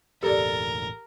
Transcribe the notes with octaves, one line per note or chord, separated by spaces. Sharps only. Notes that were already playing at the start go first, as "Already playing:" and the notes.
E1 A1 G4 A4 A#4 D5